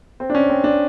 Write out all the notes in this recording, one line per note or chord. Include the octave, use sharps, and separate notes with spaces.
C4
D4
C#4
C4
D4